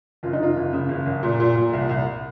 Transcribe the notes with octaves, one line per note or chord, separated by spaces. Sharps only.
F#1 F4
D#4
F#1 F4
F#1
C#3
F#1
F#1
A#2
A#2
A#2
C2
C2